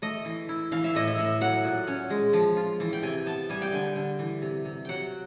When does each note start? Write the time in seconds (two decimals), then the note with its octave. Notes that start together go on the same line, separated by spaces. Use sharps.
0.02 A3 D#5
0.25 E3
0.49 E4
0.72 E3 F5
0.84 E5
0.95 A2 D#5
1.08 E5
1.18 A2
1.41 F#3 F#5
1.64 A#2
1.87 C#4
2.10 G#3
2.33 F3
2.57 F4
2.80 E3
2.93 G5
3.03 C3 G#5
3.26 B3 A5
3.49 G3 G#5
3.62 G5
3.72 D3 G#5
3.96 D3
4.19 E3
4.42 C3
4.65 C3
4.85 F#3 F#5 G5